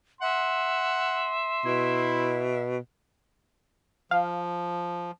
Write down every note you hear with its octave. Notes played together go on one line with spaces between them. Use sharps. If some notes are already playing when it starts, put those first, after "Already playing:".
E5 F#5 C6
B2 E4
F3 F5